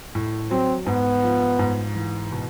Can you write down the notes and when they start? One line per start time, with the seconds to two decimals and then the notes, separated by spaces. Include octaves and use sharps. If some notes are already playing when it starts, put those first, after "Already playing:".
0.15 A2
0.51 F#3 C4
0.86 G#2 B3
1.23 F3
1.59 G#2
1.95 E3
2.32 B2